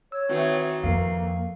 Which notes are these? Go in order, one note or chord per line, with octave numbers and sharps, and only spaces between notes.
C#5 E6
D#3 E3 A3 C4 F#4
F2 A#3 F5 C7